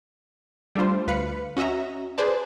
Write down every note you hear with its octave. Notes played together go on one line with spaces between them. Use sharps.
G3 A3 D4 F4 C5
D2 B4 F5 B5 C#7
C#4 F#4 D#5 E5 A#5
G#4 B4 C5 D5 A5